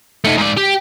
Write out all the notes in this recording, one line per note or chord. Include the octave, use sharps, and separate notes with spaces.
A3 D#4
G#2 D5
G4